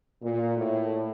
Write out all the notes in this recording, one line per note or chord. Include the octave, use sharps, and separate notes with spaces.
A#2
A2